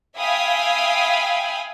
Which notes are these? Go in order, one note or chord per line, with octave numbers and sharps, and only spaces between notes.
E5 F5 G5 G#5 B5 D#6